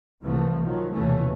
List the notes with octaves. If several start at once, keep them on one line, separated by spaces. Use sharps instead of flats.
C2 C3 E3 F3 A3
D#3 F3 F#3
F1 D#2 B2 E3 A3 C#4